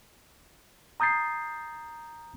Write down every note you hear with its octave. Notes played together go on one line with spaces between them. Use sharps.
A#5 D#6 G6 A6 C7